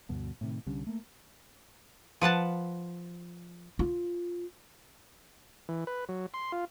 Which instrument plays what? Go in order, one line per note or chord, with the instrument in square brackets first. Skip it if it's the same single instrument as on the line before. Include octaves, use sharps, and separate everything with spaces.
[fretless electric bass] D2 G2 B2
A2 C3 D#3
C2 D3 G3 C#4
A3 A#3
[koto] F3 B4 F#5 A5
[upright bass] F4
[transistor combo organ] E3
B4
F#3
C6
F4